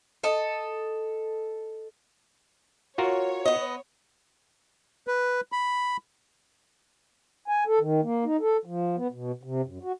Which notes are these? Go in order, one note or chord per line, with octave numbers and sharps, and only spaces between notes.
A4 D#5
F4 F#4 A#4 C#5
B3 D#5
B4
B5
G#5
A4
D#3
A#3
D#4
A4
F3
B3
B2
C3
F#2
F#4